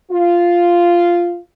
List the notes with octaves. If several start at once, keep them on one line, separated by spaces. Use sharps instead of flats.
F4